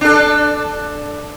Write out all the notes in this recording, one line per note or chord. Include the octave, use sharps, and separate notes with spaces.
D4 A4